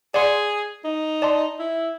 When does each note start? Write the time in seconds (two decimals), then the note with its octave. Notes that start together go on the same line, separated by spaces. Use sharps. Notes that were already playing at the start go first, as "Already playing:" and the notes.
0.14 G#4 D5 F#5 C6
0.84 D#4
1.22 D5 A5 C6
1.59 E4